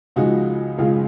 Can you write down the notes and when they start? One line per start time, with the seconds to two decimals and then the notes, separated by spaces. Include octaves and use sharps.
0.16 C#2 C#3 F3 G#3 D#4 F#4
0.78 C#2 C#3 F3 G#3 F4 G#4